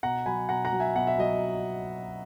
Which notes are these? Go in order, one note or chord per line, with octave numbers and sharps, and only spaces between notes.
B2 F#5 A#5
F#3 G#5 B5
B2 F#5 A#5
F#5 A#5
F#3
E5 G#5
B2 F#5
E5
F#3 D#5